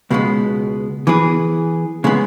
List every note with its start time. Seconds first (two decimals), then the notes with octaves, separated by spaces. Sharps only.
0.10 C#2 B2 G#3 B3
1.07 E3 B3 G#4 B4
2.04 C#3 G#3 B3